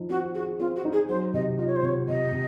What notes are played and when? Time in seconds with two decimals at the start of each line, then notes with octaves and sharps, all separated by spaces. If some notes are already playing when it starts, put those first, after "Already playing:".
Already playing: F3 D#4
0.10 C4 F#4
0.35 F#4 G#4
0.60 C4 F4
0.76 F#4
0.85 D#4
0.93 G#4
1.09 F#3 C5
1.34 C3 D#5
1.59 F4 D#5
1.67 C#5
1.76 C5
1.83 C3 C#5
2.08 C3 D#5
2.32 C3